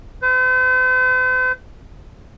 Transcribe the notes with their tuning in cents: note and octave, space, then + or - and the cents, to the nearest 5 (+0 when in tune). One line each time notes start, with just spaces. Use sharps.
C5 -45